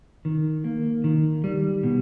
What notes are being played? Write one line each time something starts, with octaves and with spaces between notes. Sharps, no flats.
D#3
A#3
D#3
G3
B2